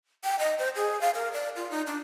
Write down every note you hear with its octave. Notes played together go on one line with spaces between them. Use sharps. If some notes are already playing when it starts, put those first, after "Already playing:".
G5
D#5
C5
G#4
F5
A#4
D5
F4
D#4
D4